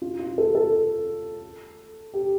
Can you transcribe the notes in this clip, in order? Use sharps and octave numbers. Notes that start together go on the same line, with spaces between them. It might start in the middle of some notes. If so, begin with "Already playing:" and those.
F4
F4
A4
A4
G4